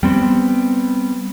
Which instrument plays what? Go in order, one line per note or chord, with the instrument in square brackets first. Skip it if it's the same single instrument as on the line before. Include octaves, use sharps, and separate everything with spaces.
[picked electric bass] G3 B3 C4